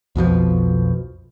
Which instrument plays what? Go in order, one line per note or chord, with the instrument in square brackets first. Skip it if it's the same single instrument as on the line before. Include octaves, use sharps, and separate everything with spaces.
[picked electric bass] B1 F2 B2 F3